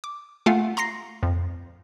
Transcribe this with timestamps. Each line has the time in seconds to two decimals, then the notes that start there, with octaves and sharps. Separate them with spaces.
0.04 D6
0.46 A3 F4 F5 F#5 G#5
0.77 A#5 C6 A#6 C7
1.23 F2